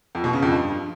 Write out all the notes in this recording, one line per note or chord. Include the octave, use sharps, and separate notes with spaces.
F2
B2
C#3
F2
G2